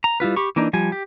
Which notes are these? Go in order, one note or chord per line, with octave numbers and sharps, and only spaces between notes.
A#5
G3 E4 F4 B4
G4 B5 C#6
E3 A#3 D4 D#4
F3 G3 G#5
G4